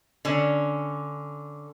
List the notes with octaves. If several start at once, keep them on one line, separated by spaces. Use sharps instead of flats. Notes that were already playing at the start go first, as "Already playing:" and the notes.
D3 C#4